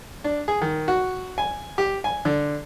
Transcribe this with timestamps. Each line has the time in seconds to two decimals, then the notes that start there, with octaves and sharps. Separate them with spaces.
0.24 D4
0.48 G#4
0.62 D#3
0.88 F#4
1.38 G#5
1.78 G4
2.04 G#5
2.25 D3